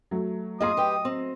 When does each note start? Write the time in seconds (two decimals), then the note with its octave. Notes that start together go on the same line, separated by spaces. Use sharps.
0.11 F#3 A3
0.60 A#3 F4 G#4 D#5 C6 D#6
0.77 G4 B4 G5
1.05 C4